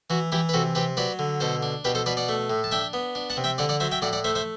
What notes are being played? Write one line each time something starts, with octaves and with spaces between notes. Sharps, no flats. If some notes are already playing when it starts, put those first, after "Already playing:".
E3 F#4
E3 E4 G4
B4
C3 F#4 A4
C3 G4 B4
F#3 B4 D5
D3
B2 A4 C5
D4
B2 G4 B4
A4 C5
B2 B4 D5
D5 F#5
A3
A2
A5
D4 E5 G5
B3
D4
F#5 A5
C3
E5 G5
D3 D5 F#5
D5 F#5
F#3 C5 E5
E5 G5
A2 D5 F#5
D5 F#5
A3 C5 E5
C5 E5